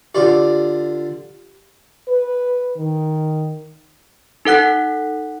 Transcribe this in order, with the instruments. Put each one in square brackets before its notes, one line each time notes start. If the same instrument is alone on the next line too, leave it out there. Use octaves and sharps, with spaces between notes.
[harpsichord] D3 F4 D5 [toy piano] G4
[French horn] B4
D#3
[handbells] D#4 A4 F#5 F#6 B6